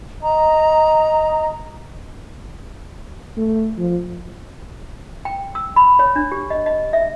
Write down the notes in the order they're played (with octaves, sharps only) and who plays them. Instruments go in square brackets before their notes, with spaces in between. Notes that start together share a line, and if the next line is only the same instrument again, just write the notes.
[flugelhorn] D#5 [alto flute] A#5
[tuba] A3
F3
[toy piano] G5
E6
B5
C#5
D4
G4
D#5
D#5
E5